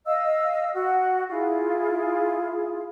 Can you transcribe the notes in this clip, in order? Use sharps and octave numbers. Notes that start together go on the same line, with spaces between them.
D#5 F5 E6
F#4
E4 F4 G#4